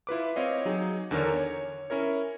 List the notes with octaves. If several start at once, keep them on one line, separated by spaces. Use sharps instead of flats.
E4 F4 B4 D6
C4 C#5 D#5 F5
F#3 D#4 G#4
E2 D3 D#3 A#4 C#5
C#5
C#4 E4 A#4 C#5